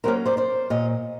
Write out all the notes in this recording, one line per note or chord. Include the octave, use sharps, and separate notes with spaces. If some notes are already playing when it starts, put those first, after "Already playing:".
A2 F#3 A#3 C#4 A#4 C5
C5 D5
C5 D5
A#2 C#5 D#5